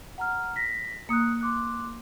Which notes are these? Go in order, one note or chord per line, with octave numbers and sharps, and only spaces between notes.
F#5 A#5 F6
A#6 B6
A#3 D#6 F#6 C#7
C6 D6 F#6